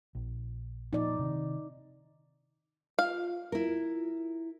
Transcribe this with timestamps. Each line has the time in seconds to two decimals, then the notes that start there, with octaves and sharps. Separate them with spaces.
0.15 A#1
0.93 A#2 F3 D#4 D5
1.19 C3 D#3
2.99 F4 F5
3.52 E4 A#4